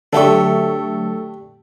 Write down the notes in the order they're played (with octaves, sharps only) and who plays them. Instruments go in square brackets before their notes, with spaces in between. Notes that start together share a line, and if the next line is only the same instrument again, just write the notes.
[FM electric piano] D3 F#3 A3 [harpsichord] D4 G4 E5 [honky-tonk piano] A4 C#6